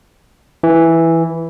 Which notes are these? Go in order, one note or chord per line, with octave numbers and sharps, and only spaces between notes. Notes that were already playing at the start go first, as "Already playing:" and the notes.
E3